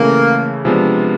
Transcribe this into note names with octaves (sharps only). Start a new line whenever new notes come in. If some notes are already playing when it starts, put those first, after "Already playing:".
Already playing: C#3 E3 A3 A#3
C3 F3 G#3 B3 D4